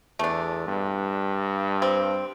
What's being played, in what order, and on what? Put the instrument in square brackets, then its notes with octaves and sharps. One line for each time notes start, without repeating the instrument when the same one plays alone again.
[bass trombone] E2 [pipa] A3 D4
[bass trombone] G2
[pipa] C4